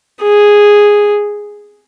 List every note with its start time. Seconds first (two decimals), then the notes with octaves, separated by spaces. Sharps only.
0.23 G#4